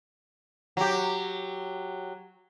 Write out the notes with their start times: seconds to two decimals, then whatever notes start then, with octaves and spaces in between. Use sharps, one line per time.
0.77 F#3 G4